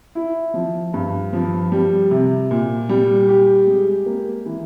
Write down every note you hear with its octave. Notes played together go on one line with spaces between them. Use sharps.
E4
F3
G2
F3
G3
C3
A#2
G3
G4
G#3
A#3
E3